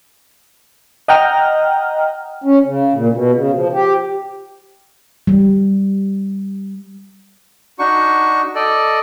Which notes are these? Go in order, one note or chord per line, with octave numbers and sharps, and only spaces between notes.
D#5 F#5 G5 A#5 F6
C#4
C#3
A#2
B2
C#3
F3
G4
G3
D4 D#4 F#4 C#6
A4 D5 D#5